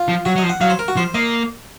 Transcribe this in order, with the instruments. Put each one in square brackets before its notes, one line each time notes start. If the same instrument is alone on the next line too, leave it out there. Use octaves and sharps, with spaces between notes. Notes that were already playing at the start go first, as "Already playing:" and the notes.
Already playing: [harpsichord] F4
[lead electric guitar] F3
[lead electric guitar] F#3 [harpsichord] F#4
[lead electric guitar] F#3 [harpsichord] D#5
[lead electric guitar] F3
[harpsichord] F#5
[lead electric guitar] F#3 [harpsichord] F5
[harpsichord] C5
A#4
F#4
[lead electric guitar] F3 [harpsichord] C5
[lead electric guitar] A#3 [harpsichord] D#5